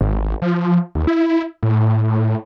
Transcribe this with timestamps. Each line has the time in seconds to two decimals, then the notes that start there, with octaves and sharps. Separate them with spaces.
0.01 G#1
0.42 F3
0.95 D#2
1.07 E4
1.63 A2